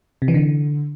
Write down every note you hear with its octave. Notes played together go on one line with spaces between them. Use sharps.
C3
E3
D3